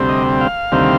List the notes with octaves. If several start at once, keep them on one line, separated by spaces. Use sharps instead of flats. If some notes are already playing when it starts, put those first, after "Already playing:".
Already playing: D2 C3 G3 C4
D#5
F5
D2 C3 D#3 G3 C4